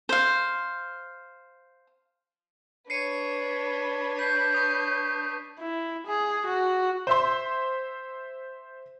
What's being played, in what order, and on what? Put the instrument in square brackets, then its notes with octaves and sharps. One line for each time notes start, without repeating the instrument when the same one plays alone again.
[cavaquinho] C5 F5
[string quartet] D4 B4 [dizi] C#5 [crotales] C7 C#7 D#7
[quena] G6 [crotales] B6 C7
[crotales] C#6 D#6
[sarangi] E4
G#4
F#4
[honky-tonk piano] C5 E5 C6